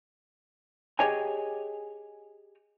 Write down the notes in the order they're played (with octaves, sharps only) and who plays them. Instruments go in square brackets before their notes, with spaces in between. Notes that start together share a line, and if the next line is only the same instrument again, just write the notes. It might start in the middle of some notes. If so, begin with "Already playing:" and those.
[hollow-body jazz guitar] G4 G#4 C#5 D#5 G5 G#5